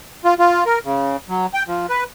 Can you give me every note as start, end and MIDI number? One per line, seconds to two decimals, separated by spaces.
0.25 0.34 65
0.39 0.64 65
0.66 0.79 70
0.85 1.17 49
1.29 1.46 54
1.54 1.63 79
1.68 1.86 53
1.89 2.04 71